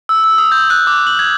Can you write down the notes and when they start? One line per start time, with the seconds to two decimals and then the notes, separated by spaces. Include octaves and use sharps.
0.09 E6
0.24 E6
0.38 D#6
0.52 G6
0.70 F#6
0.87 D6
1.07 F#7
1.19 G#6